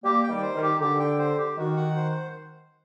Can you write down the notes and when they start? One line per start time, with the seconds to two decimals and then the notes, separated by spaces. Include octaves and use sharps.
0.04 G3 A#3 G4
0.23 G5
0.29 D#3 G3
0.42 C5
0.55 D#3
0.62 G4
0.81 D3 G4
0.99 G5
1.19 C5
1.38 G4
1.58 D#3 F#4
1.77 F#5
1.96 C5